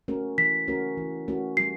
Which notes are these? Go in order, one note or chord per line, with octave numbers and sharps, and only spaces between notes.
A3 C#4 F#4 A#4
E3 B6
A3 C#4 F#4 A#4
E3
A3 C#4 F#4 A#4
G3 C7